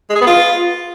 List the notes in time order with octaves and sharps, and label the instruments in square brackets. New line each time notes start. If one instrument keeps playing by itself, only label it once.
[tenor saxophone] G#3
G#4
B3
F4